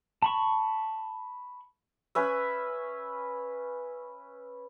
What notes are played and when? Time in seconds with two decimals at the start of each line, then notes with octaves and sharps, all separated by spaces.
0.22 A5 B5 C#6
2.15 C#4 B4 E5